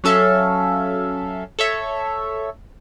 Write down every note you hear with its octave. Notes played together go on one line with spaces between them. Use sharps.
F#3 C#4 A4 E5 F5
A4 C#5 E5